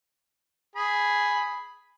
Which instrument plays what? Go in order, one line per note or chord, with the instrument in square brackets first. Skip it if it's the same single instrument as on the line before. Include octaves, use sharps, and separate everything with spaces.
[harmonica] G#4 B5